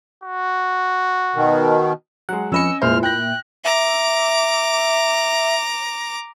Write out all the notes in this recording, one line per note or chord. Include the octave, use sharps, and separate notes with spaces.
F#4
B2 D#3
F#3 G#3 F#5
F2 C#4 B4 D#5 G#5 E6 C#7
F1 A#2 G#3 E4 C5 F6
G5 F#6 G6 A#6
E5 A#5 D6